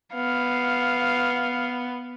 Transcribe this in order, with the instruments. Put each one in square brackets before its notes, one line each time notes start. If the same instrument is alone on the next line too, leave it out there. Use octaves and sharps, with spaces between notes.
[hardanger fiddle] B3 [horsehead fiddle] F5